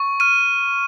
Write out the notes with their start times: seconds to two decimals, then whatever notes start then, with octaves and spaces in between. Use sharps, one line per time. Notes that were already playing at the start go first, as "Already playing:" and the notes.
Already playing: C#6
0.20 F6 D#7